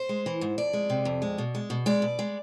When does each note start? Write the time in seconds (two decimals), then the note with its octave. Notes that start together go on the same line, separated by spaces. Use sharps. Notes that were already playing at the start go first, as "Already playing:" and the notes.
Already playing: C5
0.09 G#3
0.26 E3
0.41 G#2
0.58 F2 D5
0.73 G#3
0.90 C3
1.05 F2
1.22 G#3
1.38 B2
1.55 G#3
1.70 B2
1.86 G#3 D5
2.02 B2
2.19 G#3